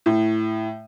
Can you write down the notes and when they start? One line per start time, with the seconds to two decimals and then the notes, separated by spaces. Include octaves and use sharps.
0.06 A2